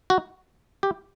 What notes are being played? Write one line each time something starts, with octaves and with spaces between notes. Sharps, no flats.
F#4
G4